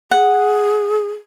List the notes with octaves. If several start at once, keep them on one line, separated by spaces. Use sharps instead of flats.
G#4 F#5